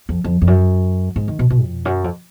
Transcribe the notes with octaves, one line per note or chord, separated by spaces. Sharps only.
F2
F2
F2
F#2
G#2
D#3
B2
B2
F2
F#2
F2